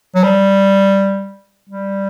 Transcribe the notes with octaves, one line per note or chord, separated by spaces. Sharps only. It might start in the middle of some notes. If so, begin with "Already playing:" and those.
F#3
G3
G3